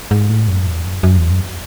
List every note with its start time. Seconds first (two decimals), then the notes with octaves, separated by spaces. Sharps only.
0.11 G#2
0.29 A2
0.48 F#2
0.67 E2
0.85 F#2
1.03 F#2
1.17 E2
1.31 F#2